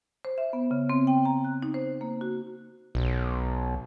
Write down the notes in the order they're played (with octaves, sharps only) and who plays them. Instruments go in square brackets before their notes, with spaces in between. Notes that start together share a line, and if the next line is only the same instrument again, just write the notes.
[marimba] C5
E5
B3
C#3
C4
G5
A#5
F#6
D#4
C5
A#3
F#4
[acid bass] B1